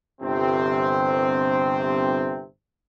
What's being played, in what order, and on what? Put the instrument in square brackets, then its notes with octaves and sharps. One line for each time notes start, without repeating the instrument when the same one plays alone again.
[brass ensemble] G1 C3 C4